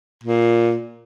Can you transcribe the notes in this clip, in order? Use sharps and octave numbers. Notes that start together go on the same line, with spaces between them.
A#2